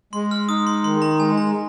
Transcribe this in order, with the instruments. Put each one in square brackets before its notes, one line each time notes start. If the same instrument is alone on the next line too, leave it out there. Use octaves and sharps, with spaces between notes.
[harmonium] G#3 [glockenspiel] C6
[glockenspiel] F6
[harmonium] D#4 [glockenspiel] D#6
[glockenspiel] C6
[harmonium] D#3 [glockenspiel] C6
[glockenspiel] A#5
[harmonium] G#3 [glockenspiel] G#5
[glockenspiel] A#5